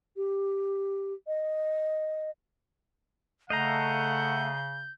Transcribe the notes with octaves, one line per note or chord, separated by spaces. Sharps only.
G4
D#5
C#3 A3 D#5 F5 F#5 A#5 G6